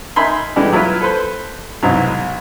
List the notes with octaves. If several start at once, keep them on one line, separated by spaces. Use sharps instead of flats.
D#4 A#4 E5 G#5 B5 C6
D3 E3 G3 G#3
F#3 E4 F4 B4
A4 B4 C5
C2 G#2 B2 F#3